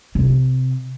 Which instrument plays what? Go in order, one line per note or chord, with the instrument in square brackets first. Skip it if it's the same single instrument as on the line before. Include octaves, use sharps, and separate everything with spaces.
[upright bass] C3